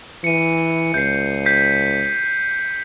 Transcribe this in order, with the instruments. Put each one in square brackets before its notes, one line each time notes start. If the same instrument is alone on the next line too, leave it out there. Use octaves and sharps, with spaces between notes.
[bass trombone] E3 [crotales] C#7 D#7
[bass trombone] C#2 [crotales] G6 C7
[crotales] G6 B6 C7